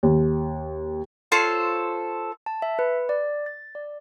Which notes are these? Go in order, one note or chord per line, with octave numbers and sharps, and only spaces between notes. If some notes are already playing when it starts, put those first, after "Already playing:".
D#2
F4 A4 C5 C#5
A5
E5
B4
D5
A6
D5